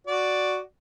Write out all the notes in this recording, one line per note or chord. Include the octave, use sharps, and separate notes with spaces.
F#4 D5